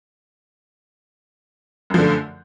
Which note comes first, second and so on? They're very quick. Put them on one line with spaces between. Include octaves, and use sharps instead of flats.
F#2 F3 D3 A3